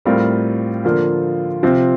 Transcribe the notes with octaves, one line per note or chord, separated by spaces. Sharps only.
A2 G3 C4 F4 A#4
D3 F3 A#3 F4
C3 F3 C4